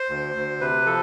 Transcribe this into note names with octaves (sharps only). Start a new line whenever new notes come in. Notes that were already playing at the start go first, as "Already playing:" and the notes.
Already playing: C5
D2
D2
C3 B4
F3 A4